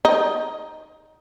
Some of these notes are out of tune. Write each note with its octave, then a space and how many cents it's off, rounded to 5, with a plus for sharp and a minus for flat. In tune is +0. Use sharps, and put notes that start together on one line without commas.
D#4 +0 D#5 +20